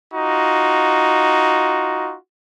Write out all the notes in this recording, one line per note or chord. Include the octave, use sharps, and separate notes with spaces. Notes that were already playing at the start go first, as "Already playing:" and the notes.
D#4 F4 F#4